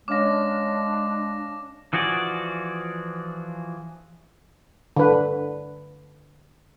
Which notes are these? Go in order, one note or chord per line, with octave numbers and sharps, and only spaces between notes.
G#3 C#4 D4 F5 D6 A#6
E3 F3 F#4 G#4 D5
D3 B4